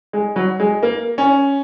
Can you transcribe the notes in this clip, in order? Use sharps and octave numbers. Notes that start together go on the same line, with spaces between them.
G#3
F#3
G#3
A#3
C#4